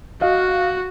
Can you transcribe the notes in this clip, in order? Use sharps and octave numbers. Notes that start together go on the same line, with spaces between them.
F#4 D#5 F5